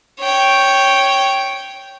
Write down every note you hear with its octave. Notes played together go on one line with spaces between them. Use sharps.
C#5 G5